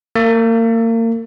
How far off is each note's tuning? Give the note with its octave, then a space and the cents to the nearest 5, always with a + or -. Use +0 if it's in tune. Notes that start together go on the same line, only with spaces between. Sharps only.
A#3 -35